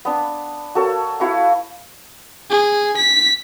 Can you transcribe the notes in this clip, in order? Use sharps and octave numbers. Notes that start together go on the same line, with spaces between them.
B3 D4
F#4 A4 A#4 C#5
E4 F#4 B4 F5
G#4
B6